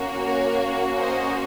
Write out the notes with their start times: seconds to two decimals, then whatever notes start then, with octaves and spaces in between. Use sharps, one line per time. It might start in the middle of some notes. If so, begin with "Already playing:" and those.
Already playing: A#3 C#4 F#4
0.23 A#4 C#5
0.99 C5 D#5